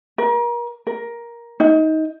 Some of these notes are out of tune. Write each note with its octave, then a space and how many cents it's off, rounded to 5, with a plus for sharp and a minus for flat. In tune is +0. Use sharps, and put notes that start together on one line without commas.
A#4 +35
A#4 +10
D#4 +20